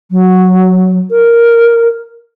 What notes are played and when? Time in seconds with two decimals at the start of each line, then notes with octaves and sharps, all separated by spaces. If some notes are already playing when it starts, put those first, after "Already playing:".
0.11 F#3
1.11 A#4